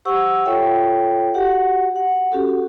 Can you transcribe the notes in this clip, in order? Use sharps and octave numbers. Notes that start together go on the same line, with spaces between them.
G4 C5 F#5 C#6 E6
F4 A4 C#5 E5 G5
F#4 G4 F#5
F#5
C#4 F#4 G4 A4